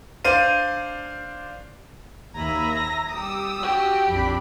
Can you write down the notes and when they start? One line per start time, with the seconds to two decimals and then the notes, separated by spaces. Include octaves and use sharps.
0.25 D4 C5 D5 F5 D#7
2.35 D#2 A#3 E5 G#5 A#5 B5
2.74 A#6
3.11 G3 G4 D#6 E6
3.63 D4 F#4 G4
4.09 A#1 F2 C4 D4 B5